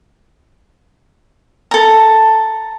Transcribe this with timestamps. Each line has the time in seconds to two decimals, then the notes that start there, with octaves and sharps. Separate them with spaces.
1.71 A4 A#5